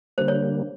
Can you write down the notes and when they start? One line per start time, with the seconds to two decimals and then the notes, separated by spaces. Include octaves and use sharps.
0.18 D3 G3 A#3 C5
0.28 C#5